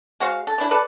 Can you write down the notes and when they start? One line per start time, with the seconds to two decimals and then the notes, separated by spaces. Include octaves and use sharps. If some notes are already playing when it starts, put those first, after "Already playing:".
0.20 G#3 F#4 C5 F5
0.47 A4
0.58 E3 D4 E4
0.71 A4 B4 D5